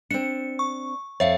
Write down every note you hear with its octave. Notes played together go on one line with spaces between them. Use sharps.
C4 D4 C#7
C#6
F2 C#5 E5 F5